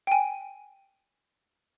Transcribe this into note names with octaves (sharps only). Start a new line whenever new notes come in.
G5 G#5